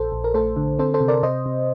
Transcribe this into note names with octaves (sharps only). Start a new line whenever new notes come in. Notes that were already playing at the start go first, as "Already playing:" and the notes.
Already playing: A#1 A4 C5
A#1
A#4
A3 A4 C5
D3
C4 A4 C5
A4 C5
C3
A#4 D5
C3 C5 D#5
C3